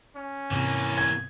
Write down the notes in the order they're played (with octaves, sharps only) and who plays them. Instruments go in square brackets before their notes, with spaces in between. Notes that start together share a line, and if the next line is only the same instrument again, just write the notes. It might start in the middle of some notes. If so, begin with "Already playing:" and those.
[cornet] C#4
[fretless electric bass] G#2 C3 C4 [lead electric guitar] E3 A#3
[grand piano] G#6